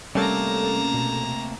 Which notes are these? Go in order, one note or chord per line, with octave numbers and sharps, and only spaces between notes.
C3 G3 A3 A#3 C#4 A4 A5 A#5
B2